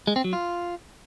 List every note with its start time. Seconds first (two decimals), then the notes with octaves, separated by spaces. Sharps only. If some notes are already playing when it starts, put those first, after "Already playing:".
0.07 G#3
0.16 C4
0.24 F#3
0.33 F4